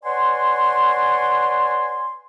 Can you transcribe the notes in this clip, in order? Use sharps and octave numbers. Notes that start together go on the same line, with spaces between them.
B4 C#5 D5 F#5 G#5 C6